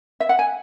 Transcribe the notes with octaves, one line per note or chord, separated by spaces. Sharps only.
E5
F#5
G#5